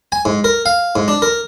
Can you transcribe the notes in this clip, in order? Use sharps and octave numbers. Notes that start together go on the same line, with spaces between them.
G#5
G#2
A#4
F5
G#2
D4
A#4